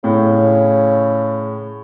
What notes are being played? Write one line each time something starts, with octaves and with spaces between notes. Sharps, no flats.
A2 C#3